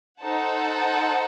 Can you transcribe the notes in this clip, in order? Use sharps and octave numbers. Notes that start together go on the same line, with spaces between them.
D#4 A4 C5 F#5 A5